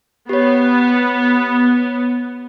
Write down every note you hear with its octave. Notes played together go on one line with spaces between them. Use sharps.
B3 G4 C#5